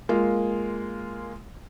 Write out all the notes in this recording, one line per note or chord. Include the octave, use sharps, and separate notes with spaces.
G#3 A#3 F4